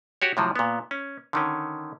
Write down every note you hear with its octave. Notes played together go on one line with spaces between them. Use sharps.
F#4 G4 C#5
A2 C3 F3 F#3
A#2 B3
C#4
D3 D#3 C#4